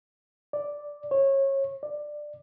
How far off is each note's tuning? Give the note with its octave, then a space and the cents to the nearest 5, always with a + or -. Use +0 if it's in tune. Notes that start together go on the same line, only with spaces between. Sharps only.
D5 +0
C#5 -25
D5 +15